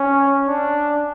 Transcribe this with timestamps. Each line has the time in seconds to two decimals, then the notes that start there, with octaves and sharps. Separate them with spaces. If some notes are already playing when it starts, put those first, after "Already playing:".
Already playing: C#4
0.48 D4